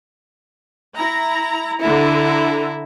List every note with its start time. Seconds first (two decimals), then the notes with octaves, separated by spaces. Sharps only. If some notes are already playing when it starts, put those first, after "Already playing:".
0.95 E4 A#5
1.80 D3 E4 A4 A#5